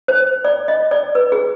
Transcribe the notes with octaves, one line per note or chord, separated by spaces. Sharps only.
C5
D5
D#5
D5
B4
G#4